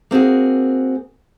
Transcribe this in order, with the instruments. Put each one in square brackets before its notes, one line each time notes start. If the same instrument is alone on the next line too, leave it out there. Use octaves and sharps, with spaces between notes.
[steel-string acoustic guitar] A#3 C4 F#4 G#4